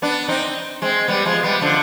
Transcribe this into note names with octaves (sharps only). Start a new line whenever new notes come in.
B3 D4
C4 D#4
G#3 C4
G3 B3
F3 G#3
G3 B3
D3 F3